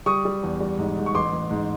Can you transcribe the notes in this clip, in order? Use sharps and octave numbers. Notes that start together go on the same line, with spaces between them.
G3 C#6 D#6
G3
E2
G3
G#2
G#2
C#6
A1 C6 D6
A1
G#2